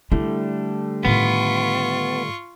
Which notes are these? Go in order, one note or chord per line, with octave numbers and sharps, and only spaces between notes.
D3 G3 A3 E4
A2 D#3 B3 F4 C#6